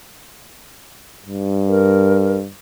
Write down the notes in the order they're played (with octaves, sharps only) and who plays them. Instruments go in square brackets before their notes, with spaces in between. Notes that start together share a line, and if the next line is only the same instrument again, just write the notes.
[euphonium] G2
[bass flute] A#4